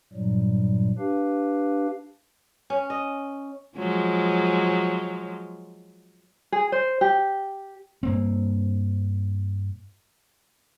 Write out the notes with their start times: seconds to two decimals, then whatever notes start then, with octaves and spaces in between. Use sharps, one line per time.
0.13 G2 A#2 F#3 G3
0.99 D4 G4 B4 F5
2.70 C#4
2.90 D#5
3.77 F3 F#3 G#3
6.52 G#4
6.72 C5
7.01 G4
8.03 G2 A#3 C4